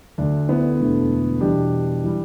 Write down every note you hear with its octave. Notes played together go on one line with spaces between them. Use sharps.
D2 D3 A3 D4
B3 E4
E1 D2 D3 A3
E2 B2 G3 D4 G4
E3 G3